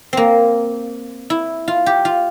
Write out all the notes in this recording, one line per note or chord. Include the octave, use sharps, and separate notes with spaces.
A#3 C4
E4
F4
G4
F4